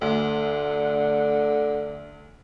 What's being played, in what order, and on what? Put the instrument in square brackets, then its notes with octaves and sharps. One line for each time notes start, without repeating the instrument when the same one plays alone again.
[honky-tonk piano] D2 [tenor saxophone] D3